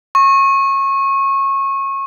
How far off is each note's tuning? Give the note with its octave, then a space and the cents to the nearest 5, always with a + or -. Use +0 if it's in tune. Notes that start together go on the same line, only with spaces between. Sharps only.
C#6 -25